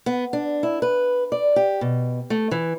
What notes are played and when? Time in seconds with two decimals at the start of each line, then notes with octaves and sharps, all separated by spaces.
0.06 B3
0.33 D4
0.63 E4
0.82 B4
1.32 D5
1.56 G4
1.81 B2
2.30 A3
2.51 E3